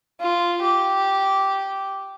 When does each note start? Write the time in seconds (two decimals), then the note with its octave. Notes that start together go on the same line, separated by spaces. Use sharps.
0.20 F4
0.62 G4